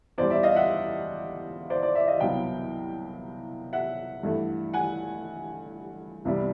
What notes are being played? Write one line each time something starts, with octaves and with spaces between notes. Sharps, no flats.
E2 B2 G3 C5 D5
D5 E5
D#5 F5
E5 F#5
C5 D5
C5 D5
D5 E5
D#5 F5
C2 B2 F#3 B3 F5 G5
E5 F#5
G2 E3 A3
F#5 G#5
C2 C3 E3 G3 B3